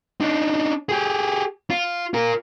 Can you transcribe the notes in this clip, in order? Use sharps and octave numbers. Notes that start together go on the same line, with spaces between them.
D4 D#4
G4 G#4
F4
F4 A#4